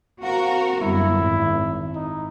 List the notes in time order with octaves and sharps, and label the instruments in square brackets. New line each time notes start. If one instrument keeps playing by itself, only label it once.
[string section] C4 F#4 A#4 [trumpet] F5
[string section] G1 F#2 [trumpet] E4
[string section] G#1
[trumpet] D#4